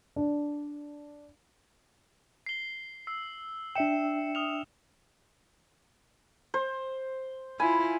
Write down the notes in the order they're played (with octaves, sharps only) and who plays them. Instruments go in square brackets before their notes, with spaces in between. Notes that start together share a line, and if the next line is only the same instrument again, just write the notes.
[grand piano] D4
[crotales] C7 G7
E6 C7
[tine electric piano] D4 E5 G5 [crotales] C#7 E7
[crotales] D#6 F6 F7
[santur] C5
[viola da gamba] E4 F4 [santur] G#5 [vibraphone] B5